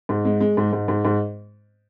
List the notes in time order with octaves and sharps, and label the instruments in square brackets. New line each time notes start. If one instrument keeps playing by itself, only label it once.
[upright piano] G#2
G#3
G#3
G#2
G#2
G#2
G#2